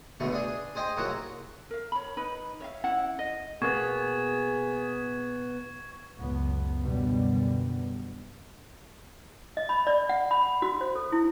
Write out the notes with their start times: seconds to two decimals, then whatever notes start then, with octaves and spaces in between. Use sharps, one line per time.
0.20 C#2 B2 D3 A3
0.32 D4 G#4
0.75 G#4 C5 D#5 G5 C6
0.97 C2 G#2 F#3 A#3 F#4
1.70 A#4 F5
1.92 C#5 B5
2.17 D#4 B4 B5
2.60 C#5 E5 F5
2.84 C#4 E4 F#5
3.19 D#5
3.62 B2 A#3 B3 G#4 C#6 G#6
6.18 F#1 C#2 B3
6.81 F#2 B2 D3 G3 B3
9.57 D#5
9.69 B5
9.87 D5
10.09 F#5
10.31 B5
10.62 F#4
10.81 C5
10.95 A4
11.12 E4